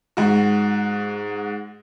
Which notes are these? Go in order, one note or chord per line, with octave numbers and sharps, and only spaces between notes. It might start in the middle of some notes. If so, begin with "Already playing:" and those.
G#2 F#4